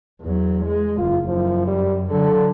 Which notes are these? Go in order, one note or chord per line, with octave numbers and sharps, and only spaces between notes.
E2 F#3
G#3
F#1 F#2 F4
F#2 F3
G3
D3 F#3 A4